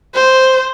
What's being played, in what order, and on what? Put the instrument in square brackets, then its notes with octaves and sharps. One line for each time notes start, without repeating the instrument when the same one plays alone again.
[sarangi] C5